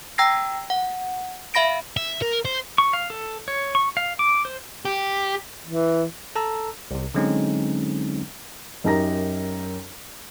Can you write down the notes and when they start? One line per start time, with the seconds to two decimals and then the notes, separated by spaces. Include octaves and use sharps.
0.18 G5 A#5 E6 G#6 A#6 C7
0.70 F#5
1.54 E5 F5 B5 A#6 D7
1.97 E5
2.22 A#4
2.45 C5
2.78 C#6
2.93 F5
3.10 A4
3.48 C#5
3.75 C#6
3.97 F5
4.19 D6
4.45 C5
4.85 G4
5.66 E3
6.36 A4 A5 A#5 E6
6.91 C2 C3
7.14 D3 F#3 G#3 C4 C#4 D#4
8.84 F#2 D#4 G4 A#4 A#5 A#6